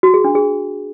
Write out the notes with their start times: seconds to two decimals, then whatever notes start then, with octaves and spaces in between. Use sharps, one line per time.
0.03 F#4
0.14 G#4
0.24 D4
0.35 G#4